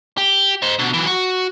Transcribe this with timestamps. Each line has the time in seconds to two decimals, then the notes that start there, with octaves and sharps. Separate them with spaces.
0.18 G4
0.62 C5 D#5
0.79 B2 D3
0.94 E3 F#3
1.07 F#4